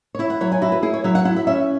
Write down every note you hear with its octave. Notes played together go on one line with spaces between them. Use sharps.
C#5
E4 E5
F#5
F#3 C#5
G#5
E4 F#4
B4
E4 G#4
C#5
F#3 E5
F#5
E4 F#5
E5
C#4 E5